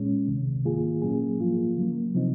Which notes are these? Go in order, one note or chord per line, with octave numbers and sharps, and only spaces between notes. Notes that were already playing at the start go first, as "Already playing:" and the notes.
Already playing: A#2 G#3 C#4
C2 C3 D#3
G#2 D#3 A#3 F4 G#4
A#2 F#3 A#3 C#4 G#4
G#2 F3 A#3 F4
C#3 F#3 A#3
C3 F3 C4 D#4